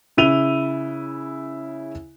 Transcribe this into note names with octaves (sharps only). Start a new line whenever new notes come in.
C#3 E4 D#7 F7 G7